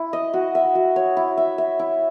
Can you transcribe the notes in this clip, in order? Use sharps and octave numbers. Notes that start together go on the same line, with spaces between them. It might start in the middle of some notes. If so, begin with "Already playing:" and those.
Already playing: E4
D#5
F#4
E5
F#4
C#5
E4
E5
E5
E4